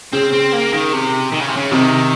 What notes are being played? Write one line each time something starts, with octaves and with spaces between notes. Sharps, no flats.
C#3 C4
C4
A#3
D#3
C3
D#3
C#3
C3
C#3
C3 D#3